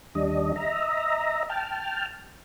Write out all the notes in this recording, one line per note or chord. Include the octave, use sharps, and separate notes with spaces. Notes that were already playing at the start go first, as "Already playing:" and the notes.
D#2 G3 D4 D#5
D#5 E5 A#5
G5 A5 F6